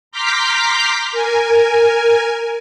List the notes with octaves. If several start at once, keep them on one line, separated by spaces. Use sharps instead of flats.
A#5 C6 D6 F6 G6 B6
A#4 G#5